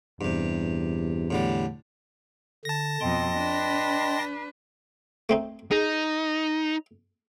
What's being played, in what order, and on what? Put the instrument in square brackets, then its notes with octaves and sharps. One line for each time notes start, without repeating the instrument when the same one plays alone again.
[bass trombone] E2 [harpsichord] G2 C3
[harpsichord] A2 D3 G3
[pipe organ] D3 [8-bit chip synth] A5 A#6
[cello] F2 B2 [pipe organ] D#5 G5 C6
[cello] D4 B4
[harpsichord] A3 C4 D#4
[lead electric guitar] D#4 [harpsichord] G#4